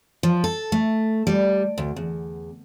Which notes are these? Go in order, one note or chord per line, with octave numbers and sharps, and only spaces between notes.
F3
A4
A3
G3
D2
E2